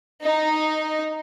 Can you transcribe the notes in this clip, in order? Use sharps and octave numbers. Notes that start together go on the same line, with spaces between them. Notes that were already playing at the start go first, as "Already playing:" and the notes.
D#4